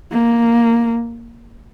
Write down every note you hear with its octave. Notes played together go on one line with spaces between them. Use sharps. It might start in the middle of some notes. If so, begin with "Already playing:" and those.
A#3